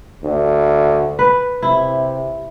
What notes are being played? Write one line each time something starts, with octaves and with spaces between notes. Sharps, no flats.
D2
B4
C3 E4